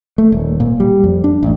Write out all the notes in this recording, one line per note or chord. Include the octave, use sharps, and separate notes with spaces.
A3
D#1
A#2
G3
F2
D4
A1